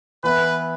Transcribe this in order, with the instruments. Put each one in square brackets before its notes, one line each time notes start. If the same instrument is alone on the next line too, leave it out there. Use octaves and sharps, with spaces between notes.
[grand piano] E3 B3 E4 [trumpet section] B4